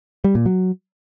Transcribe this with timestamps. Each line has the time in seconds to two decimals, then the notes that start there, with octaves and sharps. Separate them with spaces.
0.24 G3
0.35 A#2
0.46 F#3